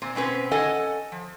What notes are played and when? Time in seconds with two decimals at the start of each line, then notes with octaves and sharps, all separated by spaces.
0.02 A#2 C4
0.15 B2 C4 C#4 B4
0.51 C#4 A4 D#5 F#5 G#5
1.12 F3